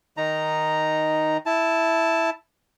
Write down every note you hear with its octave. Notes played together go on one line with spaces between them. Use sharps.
D#3 D#4 A#5
E4 A5